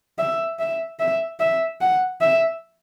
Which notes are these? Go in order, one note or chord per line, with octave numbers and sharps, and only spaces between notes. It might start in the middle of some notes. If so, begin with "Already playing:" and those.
E5
E5
E5
E5
F#5
E5